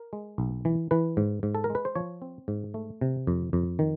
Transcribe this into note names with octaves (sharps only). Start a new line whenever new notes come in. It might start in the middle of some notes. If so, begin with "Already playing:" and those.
Already playing: A#4
G#3
B1
E3
E3 B4
G#2
G#2
A4
A#4
G#3
B4
C5
F3 C#5
C4
G#2
A3
C3
F2
F2
D#3